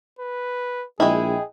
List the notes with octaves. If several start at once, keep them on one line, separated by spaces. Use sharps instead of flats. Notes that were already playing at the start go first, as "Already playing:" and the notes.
B4
A#1 G#3 E4 G#4 D#5 G5